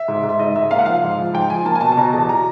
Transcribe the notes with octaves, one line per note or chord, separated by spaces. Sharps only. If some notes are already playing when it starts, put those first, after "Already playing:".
Already playing: E5
G#2
G#2
E5
G#2 D#5
G#2 E5
A#3 F5
F#5
F3 F5
G#2
F3
G#2 G5
F3 G#5
A#3 A5
G#5
B2 A5
A5
B2 A#5
E2 A5
F#3 A#5